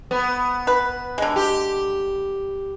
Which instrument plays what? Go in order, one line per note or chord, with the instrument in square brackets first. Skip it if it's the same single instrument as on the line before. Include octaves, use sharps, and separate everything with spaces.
[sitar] B3
[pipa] B4
D3 G#3
[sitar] G4